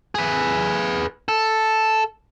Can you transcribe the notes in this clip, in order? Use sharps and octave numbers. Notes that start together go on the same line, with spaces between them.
G#4 B4
A4